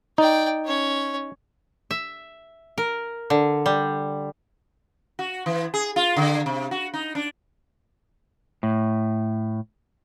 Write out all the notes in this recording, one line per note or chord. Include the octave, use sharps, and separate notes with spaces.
D#4 D5 G5
C#4 C#5
E5
A#4
D3
G3
F#4
E3
G#4
F4
D3
C3
F#4
D#4
D4
A2